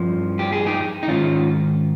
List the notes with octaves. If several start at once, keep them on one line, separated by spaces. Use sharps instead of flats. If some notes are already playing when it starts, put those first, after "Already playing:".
Already playing: G2 F3
G4
G#4
D#4 G4
D#4
G#2 D#3 C#4 F4